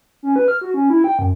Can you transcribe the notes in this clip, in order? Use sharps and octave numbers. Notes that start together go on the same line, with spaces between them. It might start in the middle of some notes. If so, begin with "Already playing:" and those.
C#4
B4
F6
F#4
C#4
E4
G5
F#2